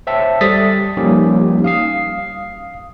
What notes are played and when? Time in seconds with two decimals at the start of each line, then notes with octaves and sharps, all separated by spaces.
0.07 C5 C#5 E5 G5 A5
0.41 G3 A4 D#6 A6 B6
0.97 F3 G3 A#3 C#4 D#4 G4
1.64 F5 D#6 C7